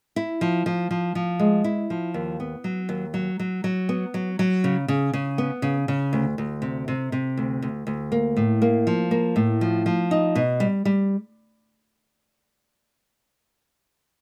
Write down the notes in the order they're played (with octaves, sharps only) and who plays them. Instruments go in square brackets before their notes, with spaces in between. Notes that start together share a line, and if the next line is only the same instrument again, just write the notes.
[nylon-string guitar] E4
F3
F3
F3
F3
G#3
E4
F3
D#2
B3
F#3
D#2
F#3
F#3
F#3
B3
F#3
F#3
C#3
C#3
C#3
B3
C#3
C#3
D2
D2
C3
C3
C3
D2
D2
D2
A#3
A2
A#3
F3
A#3
A2
F3
F3
D#4
B2
G3
G3